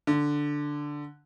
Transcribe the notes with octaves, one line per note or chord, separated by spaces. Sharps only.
D3